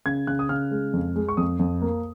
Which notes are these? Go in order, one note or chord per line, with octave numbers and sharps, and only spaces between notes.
C#3 G#6
C#3 F#6
D#6
C#3 F6
G#3
F2
G#3
C#6
F2 D#6
F2
A#3